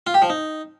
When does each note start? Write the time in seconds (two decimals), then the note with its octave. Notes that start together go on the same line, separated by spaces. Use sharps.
0.07 F4
0.14 G4
0.22 F3
0.30 D#4